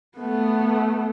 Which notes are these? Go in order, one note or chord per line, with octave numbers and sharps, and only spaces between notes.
A3 B3